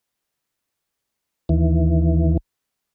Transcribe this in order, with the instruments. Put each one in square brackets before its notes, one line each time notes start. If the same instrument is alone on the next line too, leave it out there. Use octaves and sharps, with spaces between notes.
[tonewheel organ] D#2 E3